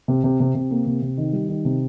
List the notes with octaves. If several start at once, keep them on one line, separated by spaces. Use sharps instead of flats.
C3
C3
C3
C3
A#3
C3
C3
D#3
G3
D#3
C3